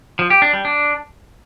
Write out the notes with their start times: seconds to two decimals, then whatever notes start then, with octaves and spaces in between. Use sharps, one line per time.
0.19 F3
0.30 G4
0.42 D4
0.53 G3
0.65 D4